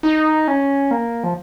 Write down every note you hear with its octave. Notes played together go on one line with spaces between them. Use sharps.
D#4
C#4
A#3
F3